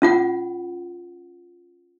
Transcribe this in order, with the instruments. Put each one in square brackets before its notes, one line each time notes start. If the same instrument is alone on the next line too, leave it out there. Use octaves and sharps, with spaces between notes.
[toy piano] C#4 F4 F#5